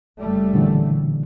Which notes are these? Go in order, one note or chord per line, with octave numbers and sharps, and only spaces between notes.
F#1 G3 A3
A#2 D3 E3